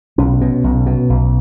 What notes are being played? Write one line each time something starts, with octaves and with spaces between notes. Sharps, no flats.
B1 C#4
B2
B1
B2
B1